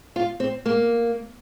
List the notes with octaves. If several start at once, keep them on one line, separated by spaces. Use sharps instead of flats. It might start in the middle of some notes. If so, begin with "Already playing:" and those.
F4
C4
A#3